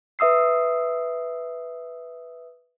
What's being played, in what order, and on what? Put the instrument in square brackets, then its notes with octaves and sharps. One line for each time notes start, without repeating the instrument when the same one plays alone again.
[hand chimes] B4 E5 D#6 E6 C7